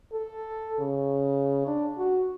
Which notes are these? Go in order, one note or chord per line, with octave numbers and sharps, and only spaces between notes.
A4
C#3
D4
F#4